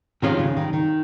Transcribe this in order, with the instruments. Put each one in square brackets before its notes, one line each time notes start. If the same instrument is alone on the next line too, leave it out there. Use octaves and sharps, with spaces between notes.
[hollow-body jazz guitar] C3 F3 G#3 C#4 F4 [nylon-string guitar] D#3
[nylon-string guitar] C#3
D#3
D#3